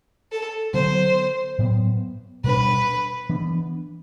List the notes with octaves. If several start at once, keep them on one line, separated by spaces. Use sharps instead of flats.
A4
D3 F#3 B3 C5
A2 F#3 B3
B2 G3 B3 D4 B4
E3 B3 D4